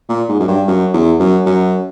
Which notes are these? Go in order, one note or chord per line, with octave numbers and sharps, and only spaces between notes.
A#2
G#2
F#2
G2
F#2
E2
F#2
F#2